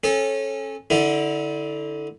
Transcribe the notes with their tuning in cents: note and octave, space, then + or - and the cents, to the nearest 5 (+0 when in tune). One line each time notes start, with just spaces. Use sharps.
C#4 -25 A4 -20
D3 +0 E4 -30 A4 +0